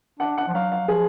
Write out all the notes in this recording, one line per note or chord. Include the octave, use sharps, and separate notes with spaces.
D4 F#5
F#5
F3
F#3 F5
F5
F3 G#4